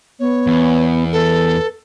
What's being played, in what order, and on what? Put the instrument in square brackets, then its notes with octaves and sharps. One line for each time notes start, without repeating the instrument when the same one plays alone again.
[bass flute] B3 [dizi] C#5
[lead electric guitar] E2
[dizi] A4 [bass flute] B4